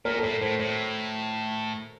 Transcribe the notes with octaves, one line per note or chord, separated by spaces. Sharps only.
A#2 A#4
A4
A2 A#4
A2 C5
A2 C#5